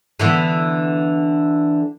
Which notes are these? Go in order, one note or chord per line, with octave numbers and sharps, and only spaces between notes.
D3 E3 B3